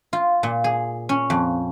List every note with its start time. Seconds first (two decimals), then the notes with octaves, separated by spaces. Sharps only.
0.13 F4
0.43 A#2
0.64 G#4
1.09 C#4
1.30 F2